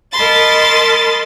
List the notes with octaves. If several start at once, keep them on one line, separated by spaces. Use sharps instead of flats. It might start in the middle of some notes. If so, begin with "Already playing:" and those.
A#4 D#5 A5 B5 C6 A6